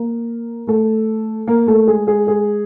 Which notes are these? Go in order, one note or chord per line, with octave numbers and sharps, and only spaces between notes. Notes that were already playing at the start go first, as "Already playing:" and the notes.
Already playing: A#3 A#4
A3 A4
A#3 A#4
A3 A4
G#3 G#4
G#3 G#4
G#3 G#4